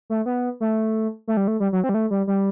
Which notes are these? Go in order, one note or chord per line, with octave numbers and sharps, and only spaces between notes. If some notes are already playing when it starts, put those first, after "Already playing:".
A3
B3
A3
A3
G3
A3
G3
F#3
C4
G3
A3
G3
G3